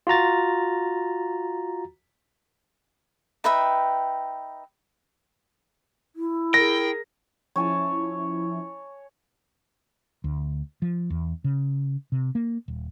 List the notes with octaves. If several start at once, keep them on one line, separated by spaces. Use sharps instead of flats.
F4 F#4 A#5 A6
D#4 B4 E5 G5
E4
G#4 A#4 G5 A#6
F3 C#4 E4 C#5 G#5 A5
D2
F3
E2
C#3
C3
A#3
D#1